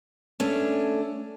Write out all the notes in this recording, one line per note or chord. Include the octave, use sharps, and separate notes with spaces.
A3 C#4 D4